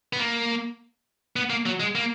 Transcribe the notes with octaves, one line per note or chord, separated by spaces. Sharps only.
B3
A#3
B3
A#3
F#3
G#3
A#3